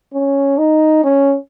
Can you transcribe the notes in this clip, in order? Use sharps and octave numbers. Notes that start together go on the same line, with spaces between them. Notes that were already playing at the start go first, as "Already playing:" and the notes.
C#4
D#4
C#4